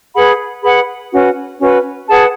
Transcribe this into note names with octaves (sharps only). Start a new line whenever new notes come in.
G#4 B4 F#5 B5
G#4 B4 F#5 B5
C#4 F#4 B4
C#4 F#4 B4
G#4 B4 F#5 A5